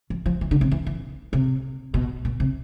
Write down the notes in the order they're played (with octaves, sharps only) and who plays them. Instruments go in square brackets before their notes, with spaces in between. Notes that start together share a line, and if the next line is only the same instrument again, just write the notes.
[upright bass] F3
F3
E3
D3
C3
E3
E3
C3
B2
B2
C3